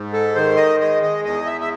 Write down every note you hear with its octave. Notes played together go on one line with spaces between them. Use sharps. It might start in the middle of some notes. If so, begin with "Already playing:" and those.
Already playing: G#2
A4
D#3 C5
D#5
G#3 D#5
D#5
E2 D#5
E5
E5